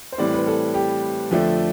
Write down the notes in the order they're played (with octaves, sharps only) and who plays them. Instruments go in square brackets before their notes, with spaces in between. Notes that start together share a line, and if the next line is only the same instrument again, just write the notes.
[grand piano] C5
A2 E3 G3 C4 D5
B4
A4
G4
F2 D3 F3 A3 D4